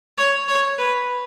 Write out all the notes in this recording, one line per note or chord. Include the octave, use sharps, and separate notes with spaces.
C#5
C#5
B4